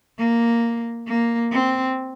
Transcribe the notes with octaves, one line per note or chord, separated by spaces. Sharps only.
A#3
A#3
C4